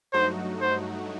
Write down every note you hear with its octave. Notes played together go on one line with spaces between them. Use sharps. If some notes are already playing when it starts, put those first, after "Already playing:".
G2 F#3 A3 D#4 F#4 C5
C5